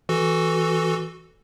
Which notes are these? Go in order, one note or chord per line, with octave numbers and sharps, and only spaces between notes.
E3 F#4 A4